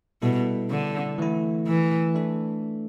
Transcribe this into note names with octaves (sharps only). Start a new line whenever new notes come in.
B2 G3 E4 A4
D3
E3 A3 E4
E3
A3 D4 A4